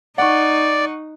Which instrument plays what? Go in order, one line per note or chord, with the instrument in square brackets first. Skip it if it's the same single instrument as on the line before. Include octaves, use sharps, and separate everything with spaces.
[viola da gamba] D#4 [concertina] D5 [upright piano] F#5 C#6